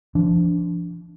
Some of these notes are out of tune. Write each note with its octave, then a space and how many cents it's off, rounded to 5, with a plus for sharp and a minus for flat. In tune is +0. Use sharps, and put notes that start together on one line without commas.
F3 -30 D4 -15